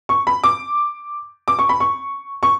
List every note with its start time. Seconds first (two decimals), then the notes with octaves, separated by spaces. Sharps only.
0.09 C#6
0.27 B5
0.44 D6
1.48 D6
1.59 C#6
1.69 B5
1.80 C#6
2.43 C#6